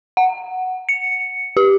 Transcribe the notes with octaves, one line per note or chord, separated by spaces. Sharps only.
F#5
C#7
G4